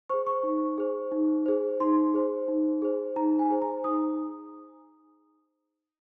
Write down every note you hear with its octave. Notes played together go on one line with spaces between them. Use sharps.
G#4 C5 C#6
C#6
D#4
G#4 C5
D#4
G#4 C5
D#4 C6
G#4 C5
D#4
G#4 C5
D#4 A#5
G#5
G#4 C5
A#5
D#4 D#6